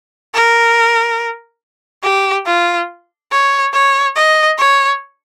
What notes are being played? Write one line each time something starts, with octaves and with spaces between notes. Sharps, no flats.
A#4
G4
F4
C#5
C#5
D#5
C#5